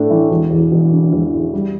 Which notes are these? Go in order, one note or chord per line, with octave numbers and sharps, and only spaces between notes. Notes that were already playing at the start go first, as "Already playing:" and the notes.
Already playing: A2 A3 D4
E3
E1
E2
E1
D3
E1
E2
G3